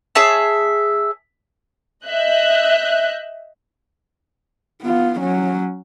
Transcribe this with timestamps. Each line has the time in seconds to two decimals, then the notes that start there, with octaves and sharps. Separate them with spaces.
0.15 G#4 C#5 E5 A5
2.06 D#5 E5 F#6 G6
4.83 B3 F4
5.20 F#3 C#4